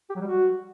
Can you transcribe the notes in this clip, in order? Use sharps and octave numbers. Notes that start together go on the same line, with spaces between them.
G4
F#3
G3
F#4